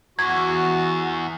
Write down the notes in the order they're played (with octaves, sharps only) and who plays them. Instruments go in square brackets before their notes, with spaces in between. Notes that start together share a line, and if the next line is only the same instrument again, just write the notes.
[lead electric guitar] E2 [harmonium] F#4 [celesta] G#6